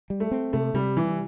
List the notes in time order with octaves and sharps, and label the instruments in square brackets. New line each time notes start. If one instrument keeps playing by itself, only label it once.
[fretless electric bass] G3
[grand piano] A3
[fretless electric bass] C4
[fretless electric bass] C3 [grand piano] A3
[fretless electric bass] C3 [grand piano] G3
[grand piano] E3 [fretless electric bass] G3